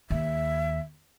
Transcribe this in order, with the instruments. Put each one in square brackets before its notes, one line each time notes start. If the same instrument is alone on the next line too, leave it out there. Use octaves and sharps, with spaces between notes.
[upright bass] D#2 [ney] E5